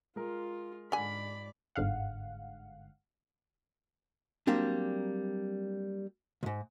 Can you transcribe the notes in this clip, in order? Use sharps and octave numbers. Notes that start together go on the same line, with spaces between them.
G#3 F4 A#4
G#2 D3 D5 G#5 B5
G1 G#2 D3 F5 F#5
F#3 G3 A#3 C4 D4
C#2 G#2